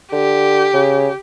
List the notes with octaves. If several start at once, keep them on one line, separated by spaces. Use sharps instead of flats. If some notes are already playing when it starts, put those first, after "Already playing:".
D3 G4
C#3